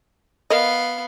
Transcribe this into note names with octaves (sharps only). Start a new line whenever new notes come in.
B3 A#4 D#5 F5